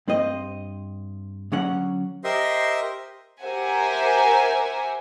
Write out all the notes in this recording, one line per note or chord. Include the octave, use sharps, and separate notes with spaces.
G2 C4 C5 D#5
D3 F#3 C#4 F#5
G4 A#4 C5 D#5 E5 C6
G4 A#4 C5 E5 F#5 G#5